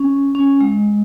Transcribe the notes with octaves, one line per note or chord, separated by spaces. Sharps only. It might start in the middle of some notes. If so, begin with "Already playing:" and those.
Already playing: C#4
C#4
G#3